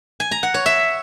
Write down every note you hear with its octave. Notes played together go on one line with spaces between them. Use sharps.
G#5
A#5
F#5
C#5
E5